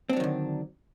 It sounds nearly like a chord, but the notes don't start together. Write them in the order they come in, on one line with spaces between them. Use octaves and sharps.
C4 D4 F#3 D#3 D3